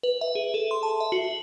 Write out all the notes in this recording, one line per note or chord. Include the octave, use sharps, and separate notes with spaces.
B4
E5
G#4
A4
C6
A5
E5
F#4
F#7